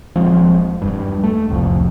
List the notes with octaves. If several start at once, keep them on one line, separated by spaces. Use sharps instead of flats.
D#1 F3 G#3 C4
E1 G2
A3
D1 C2 F2